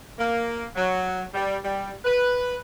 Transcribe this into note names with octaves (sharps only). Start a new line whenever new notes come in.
A#3
F#3
G3
G3
B4